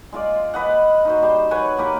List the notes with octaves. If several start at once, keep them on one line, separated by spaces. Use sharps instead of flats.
G#3 F4 D5
B4 D#5 F#5
D#4 F#4 C5
G3 C5 C6
B4 C#5 F#5 G#5
A#3 G4 A#4 B4